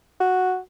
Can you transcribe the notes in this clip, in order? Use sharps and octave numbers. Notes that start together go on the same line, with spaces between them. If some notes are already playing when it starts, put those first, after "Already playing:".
F#4